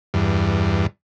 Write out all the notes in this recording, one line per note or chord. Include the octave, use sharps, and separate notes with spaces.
E2 G2